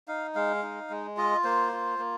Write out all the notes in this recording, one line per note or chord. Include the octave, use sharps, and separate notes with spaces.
D#4 F5
G#3 F5
D#4
G#3
F4 D#5
A#3 C5
F4
A#3